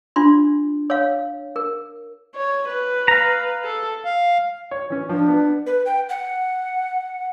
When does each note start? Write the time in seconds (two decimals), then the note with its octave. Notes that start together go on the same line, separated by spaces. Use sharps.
0.16 D4 F4 C6
0.90 C#5 F5
1.56 A#4
2.35 C#5
2.68 B4
3.08 F5 A#5
3.64 A4
4.05 F5
4.71 C#5
4.90 E3 C#4
5.09 F3 D4
5.28 B3
5.66 B4
5.86 G5
6.09 F#5